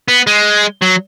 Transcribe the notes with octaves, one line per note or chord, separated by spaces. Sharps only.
B3
G#3
F#3